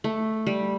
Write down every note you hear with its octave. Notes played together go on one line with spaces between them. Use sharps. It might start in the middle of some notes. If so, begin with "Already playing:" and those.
A3
G3